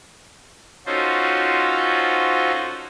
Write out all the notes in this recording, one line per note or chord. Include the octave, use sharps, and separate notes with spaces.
C#4 D#4 F4 F#4 A4 C5